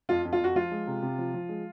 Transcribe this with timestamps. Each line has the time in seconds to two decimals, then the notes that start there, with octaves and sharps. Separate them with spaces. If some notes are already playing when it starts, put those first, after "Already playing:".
0.09 F2 F4
0.25 F2
0.33 F4
0.40 F2 F#4
0.55 F3 F4
0.71 G#3
0.87 C3
1.02 C3
1.18 F3
1.34 F3
1.49 G#3